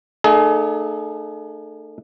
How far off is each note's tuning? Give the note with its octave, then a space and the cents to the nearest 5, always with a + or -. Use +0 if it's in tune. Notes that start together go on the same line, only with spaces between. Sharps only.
A3 +25 D#4 -40 G#4 +35